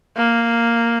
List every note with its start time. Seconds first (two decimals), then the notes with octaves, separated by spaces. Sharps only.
0.17 A#3